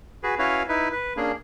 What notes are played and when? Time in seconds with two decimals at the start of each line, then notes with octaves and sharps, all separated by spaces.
0.23 F#4 G#4 B4
0.39 C#4 E4 F#4 B4 C#5 F5
0.69 D#4 E4 B4
0.92 B4
1.17 A#3 C#4 D4 G#4